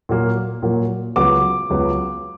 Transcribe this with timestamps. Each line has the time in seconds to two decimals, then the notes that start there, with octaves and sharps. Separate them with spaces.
0.09 A#2 F#3 A#3
0.62 A#2 F#3 A#3
1.16 C#2 C#3 F#3 B3 D6
1.70 C#2 C#3 F#3 B3